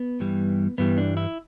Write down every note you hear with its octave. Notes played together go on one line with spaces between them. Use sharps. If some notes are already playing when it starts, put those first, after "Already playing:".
Already playing: B3
G2 E3 G3
G2 E3 G3 B3
D4
E4